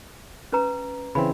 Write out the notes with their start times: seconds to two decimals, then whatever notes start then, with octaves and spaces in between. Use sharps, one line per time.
0.52 C#4 B4 A#5
1.15 C#3 E3 C4 B5